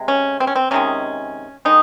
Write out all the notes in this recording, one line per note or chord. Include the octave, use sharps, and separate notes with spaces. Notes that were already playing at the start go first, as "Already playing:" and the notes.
Already playing: C3 G#3
C#4
C4
C#4
C4
C3 D#3 G#3 C#4
D#3 G#3 D#4